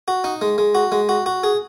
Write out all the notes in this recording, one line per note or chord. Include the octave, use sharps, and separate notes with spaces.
F#4
D#4
G#3
G#3
F#4
G#3
F#4
F#4
G#4